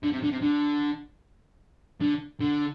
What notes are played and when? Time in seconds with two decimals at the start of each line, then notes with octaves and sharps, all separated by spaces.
0.03 D3
0.13 C3
0.23 D3
0.32 C3
0.42 D3
2.00 D3
2.40 D3